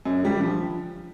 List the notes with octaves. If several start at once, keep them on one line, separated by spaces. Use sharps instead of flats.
F#2
D3 G3
F3